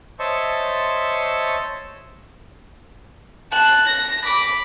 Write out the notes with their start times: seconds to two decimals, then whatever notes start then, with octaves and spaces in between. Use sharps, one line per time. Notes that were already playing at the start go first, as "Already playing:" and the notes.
0.19 C5 C#5 D#5 E5 A5 C#6
3.52 A5 F#6
3.87 A#6
4.24 B5 D6